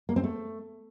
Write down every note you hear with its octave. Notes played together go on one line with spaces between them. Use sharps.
A#3
C4
A3